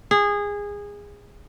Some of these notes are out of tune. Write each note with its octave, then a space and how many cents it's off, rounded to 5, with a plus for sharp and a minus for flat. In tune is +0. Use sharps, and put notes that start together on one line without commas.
G#4 -20